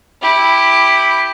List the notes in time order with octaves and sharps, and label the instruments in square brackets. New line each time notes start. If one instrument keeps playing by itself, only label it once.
[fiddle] E4 G4